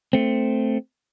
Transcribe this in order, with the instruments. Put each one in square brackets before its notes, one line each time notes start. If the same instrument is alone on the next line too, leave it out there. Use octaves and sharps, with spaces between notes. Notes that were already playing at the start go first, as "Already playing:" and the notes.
[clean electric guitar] A3 C4